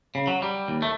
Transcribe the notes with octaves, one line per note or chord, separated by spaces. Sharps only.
C#3
F#3
G3
D#2
A3